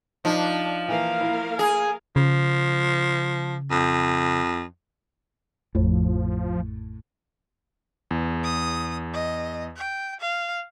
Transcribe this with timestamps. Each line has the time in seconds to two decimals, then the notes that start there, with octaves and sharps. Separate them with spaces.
0.25 F3 D4 D#4
0.88 E3 A#3 A#4 F5
1.21 E4
1.59 G#4 G#5
2.16 C#3 F3
3.71 F2
5.75 A1 F2 A2 F3
8.11 E2
8.44 D#6
9.13 D#5
9.76 G5
10.20 F5